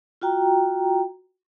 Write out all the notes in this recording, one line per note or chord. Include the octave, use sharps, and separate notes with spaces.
F4 F#4 G5 A#5